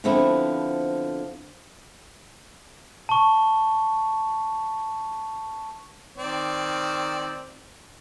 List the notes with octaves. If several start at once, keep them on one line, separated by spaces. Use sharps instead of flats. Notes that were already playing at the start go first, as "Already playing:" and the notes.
D3 F3 B3 C4 E4
A5 C#6
D#3 C4 D5